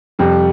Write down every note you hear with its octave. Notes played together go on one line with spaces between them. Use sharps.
F2 C3 G3